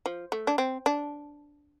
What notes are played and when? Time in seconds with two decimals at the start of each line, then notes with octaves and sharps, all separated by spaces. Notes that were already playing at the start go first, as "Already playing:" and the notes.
0.06 F3
0.32 A3
0.47 D4
0.58 C4
0.86 D4